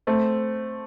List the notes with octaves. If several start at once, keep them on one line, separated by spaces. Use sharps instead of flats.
A3 C4